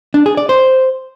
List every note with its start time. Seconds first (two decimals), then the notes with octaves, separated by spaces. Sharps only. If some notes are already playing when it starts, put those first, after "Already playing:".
0.14 D4
0.26 G#4
0.37 D5
0.49 C5